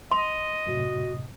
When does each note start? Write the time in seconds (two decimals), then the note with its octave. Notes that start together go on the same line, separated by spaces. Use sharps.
0.12 D#5 C6
0.67 F#2 A2 C3 F#4